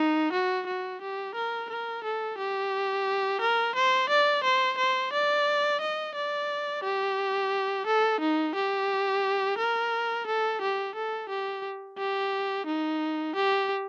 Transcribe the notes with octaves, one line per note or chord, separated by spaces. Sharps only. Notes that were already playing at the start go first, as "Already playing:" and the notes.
Already playing: D#4
F#4
F#4
G4
A#4
A#4
A4
G4
A#4
C5
D5
C5
C5
D5
D#5
D5
G4
A4
D#4
G4
A#4
A4
G4
A4
G4
G4
D#4
G4